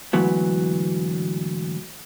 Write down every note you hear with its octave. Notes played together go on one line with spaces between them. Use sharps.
D2 G#2 E3 F#3 B3